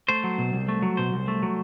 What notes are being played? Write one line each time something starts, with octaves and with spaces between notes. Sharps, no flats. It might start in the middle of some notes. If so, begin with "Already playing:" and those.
A3 C5
F#3
B2
C2
A3
F#3
B2 C5
C2
A3
F#3